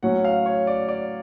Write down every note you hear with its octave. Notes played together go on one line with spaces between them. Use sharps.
A2 F#3 C#4 F#5
F5
C#5
D5
D5